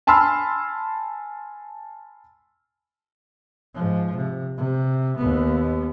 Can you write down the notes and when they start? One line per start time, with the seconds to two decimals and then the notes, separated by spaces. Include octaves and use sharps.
0.07 G#5 A5 B5 C6 E6 F6
3.74 G#2 F3
4.15 C3
4.57 C3
5.17 D#2 B3